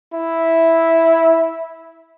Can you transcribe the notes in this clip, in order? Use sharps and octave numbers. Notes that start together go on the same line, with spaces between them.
E4